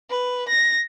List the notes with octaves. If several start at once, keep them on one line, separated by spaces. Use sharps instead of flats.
B4
A#6